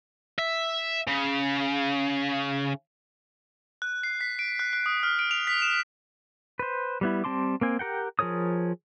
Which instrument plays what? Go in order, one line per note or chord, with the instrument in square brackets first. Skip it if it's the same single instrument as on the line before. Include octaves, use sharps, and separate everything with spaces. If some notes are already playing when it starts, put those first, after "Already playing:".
[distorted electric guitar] E5
C#3
[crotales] F#6
C7
B6
D7
F#6
F#6
D#6
F6
D7
F7
B6
E7
[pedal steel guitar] B4 C5
G3 B3 E4
G3 C4 A5 C6 D6
A#3 C4 G#5
G4 A#4 F#5 G5
F3 G#4 A#4 C#5 D#6